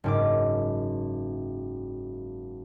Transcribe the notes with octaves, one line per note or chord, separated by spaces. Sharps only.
F#1 G#2 D6